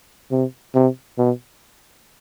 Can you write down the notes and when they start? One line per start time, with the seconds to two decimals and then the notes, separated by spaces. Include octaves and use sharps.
0.32 C3
0.75 C3
1.18 B2